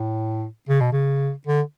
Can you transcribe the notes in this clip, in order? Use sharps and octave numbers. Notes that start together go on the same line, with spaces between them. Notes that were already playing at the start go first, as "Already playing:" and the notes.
Already playing: A2
C#3
B2
C#3
D3